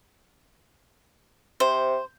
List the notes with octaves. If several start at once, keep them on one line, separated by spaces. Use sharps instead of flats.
C3 C5